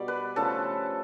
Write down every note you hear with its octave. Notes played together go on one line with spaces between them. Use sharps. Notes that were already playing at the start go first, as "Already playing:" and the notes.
Already playing: B2 G3 D5
B4
C#3 F3 A3 A4